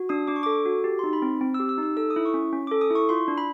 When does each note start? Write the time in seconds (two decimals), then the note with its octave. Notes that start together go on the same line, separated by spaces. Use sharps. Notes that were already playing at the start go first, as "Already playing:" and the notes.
Already playing: F#4
0.09 D4 D#6
0.27 D4 D6
0.36 C#6
0.43 A4 D6
0.65 F#4
0.84 G4
0.99 D#4 C6
1.13 B5
1.22 C4
1.41 C4
1.54 E6
1.60 G4
1.69 E6
1.78 D#4
1.83 E6
1.97 A4 E6
2.10 D#6
2.16 E4
2.25 C#6
2.34 C#4
2.53 C#4
2.67 A4 D6
2.81 D#6
2.90 E4 C#6
3.09 F4 C6
3.28 D4
3.38 B5